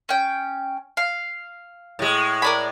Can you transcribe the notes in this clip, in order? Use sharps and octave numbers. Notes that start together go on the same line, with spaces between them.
C#4 G5
F5
A2 G#3
A#4 D5 B5